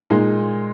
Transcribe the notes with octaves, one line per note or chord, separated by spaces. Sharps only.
A#2 G#3 D#4